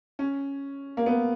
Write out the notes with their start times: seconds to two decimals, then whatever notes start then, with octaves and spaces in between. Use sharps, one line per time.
0.19 C#4
0.97 A#3
1.06 B3